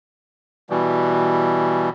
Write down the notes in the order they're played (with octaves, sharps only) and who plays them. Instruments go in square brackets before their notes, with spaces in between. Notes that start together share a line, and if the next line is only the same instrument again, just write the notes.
[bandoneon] B2 E3 G3